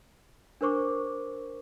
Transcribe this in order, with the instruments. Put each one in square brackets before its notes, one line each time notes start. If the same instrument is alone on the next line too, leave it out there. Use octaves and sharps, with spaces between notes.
[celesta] D4 A#4 C5 C#6 D6